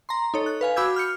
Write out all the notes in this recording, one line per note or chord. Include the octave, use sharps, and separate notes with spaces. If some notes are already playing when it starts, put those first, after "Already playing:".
A#5 C6
D#4 A4 C#5
F#6
B4 F5 G#5
F#4 B5 D6 E6 G6 G#6
F6 G6 C#7